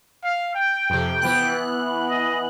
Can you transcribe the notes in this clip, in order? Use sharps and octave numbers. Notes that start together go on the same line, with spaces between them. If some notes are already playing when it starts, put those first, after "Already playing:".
F5
G5
F2 C3
E3 B3 F#6
D#5